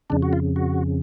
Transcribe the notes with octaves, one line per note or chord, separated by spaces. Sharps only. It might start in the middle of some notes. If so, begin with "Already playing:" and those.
F2 C#3 D4
F#4
F4
F#4